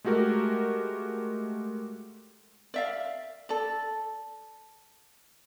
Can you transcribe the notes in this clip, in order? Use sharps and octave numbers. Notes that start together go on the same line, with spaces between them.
G#3 A3 F#4 G4 A#4
D5 E5 F5
A4 D5